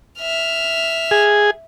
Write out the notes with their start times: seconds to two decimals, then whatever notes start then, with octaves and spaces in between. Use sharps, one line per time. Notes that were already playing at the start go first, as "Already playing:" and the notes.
0.20 E5 F6
1.11 G#4